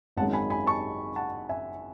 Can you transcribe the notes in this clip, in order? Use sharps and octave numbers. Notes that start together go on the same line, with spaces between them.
G#1 F#2 D#3 G#3 F#5 A5
G#5 B5
G#5 B5
A5 C#6
F#5 A5
E5 G#5